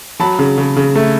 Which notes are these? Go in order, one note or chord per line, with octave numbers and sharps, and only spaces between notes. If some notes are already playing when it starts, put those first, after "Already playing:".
F#3 A5 B5
C#3
C#3
C#3
A3